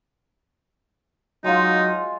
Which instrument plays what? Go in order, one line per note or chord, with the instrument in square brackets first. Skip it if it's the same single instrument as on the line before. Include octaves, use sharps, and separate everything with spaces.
[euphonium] F#3 [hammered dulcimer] G#3 F4 [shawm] D#4 [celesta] D#5 F5